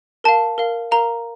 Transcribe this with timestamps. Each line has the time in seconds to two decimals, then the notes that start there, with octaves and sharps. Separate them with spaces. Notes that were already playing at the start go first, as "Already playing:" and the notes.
0.24 A#4 F5 A5
0.58 A#4 F5
0.91 A#4 F5 A#5